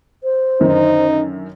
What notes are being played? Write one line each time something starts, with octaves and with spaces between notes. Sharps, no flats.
C5
F#2 D3 D#3 D#4